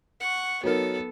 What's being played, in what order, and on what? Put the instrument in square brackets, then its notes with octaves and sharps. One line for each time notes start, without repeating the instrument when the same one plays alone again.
[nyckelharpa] F#5 C#6
[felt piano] F#3 D#4 A#4 [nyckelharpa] B3 A4